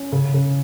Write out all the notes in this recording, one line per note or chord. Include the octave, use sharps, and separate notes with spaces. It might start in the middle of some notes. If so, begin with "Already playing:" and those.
Already playing: C#4
C#3
C#3